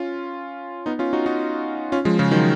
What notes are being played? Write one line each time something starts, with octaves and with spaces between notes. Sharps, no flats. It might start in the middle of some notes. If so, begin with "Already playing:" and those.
Already playing: C#4 F4
B3 D#4
C#4 F4
D#4 F#4
D#4 F#4
C#4 F4
F3 G#3
C#3 F3
D#3 F#3